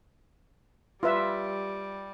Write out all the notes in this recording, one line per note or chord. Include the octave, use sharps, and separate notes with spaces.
G3 F4 B4 E5